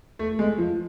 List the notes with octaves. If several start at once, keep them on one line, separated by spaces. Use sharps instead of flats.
A3
G#3
F3